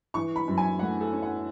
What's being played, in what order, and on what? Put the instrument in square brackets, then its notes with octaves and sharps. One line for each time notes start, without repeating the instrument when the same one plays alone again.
[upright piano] E3 C#6
B5
F#2
G#5
A3 F#5
A4
C#4
F#5